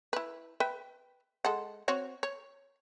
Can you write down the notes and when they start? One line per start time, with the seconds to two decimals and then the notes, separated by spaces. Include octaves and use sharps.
0.13 E4 B4
0.60 B4 E5 G5
1.45 G#3 A4 F#5
1.88 C4 F#4 C#5
2.23 C#5